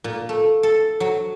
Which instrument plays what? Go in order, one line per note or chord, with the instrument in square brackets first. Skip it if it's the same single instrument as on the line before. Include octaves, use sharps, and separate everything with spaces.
[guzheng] A#2
A3
A4
F#3